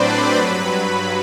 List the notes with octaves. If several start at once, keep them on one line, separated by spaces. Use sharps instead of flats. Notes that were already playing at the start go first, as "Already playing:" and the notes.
Already playing: A2 F#3 C4 D4 B4 C5 D5 B5
G2 F#3